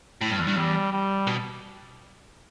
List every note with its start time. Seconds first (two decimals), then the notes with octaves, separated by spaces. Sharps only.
0.21 A2
0.30 G2
0.39 E2
0.48 G2
0.57 E2 G3
0.92 G3
1.27 B2